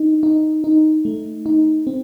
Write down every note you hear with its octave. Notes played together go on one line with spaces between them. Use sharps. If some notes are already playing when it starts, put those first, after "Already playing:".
Already playing: D#4
D#4
D#4
A3
D#4
C4